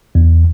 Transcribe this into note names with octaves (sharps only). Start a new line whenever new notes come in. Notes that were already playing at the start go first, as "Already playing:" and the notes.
E2